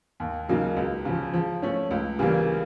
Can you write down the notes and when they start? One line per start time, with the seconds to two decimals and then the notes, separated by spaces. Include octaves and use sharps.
0.20 D#2
0.48 C#3 F#3 A#3 D#4
0.77 C#2
1.05 C#3 F3
1.34 F3
1.62 A3 C#4
1.91 C#2
2.19 C#3 E3 G3 A#3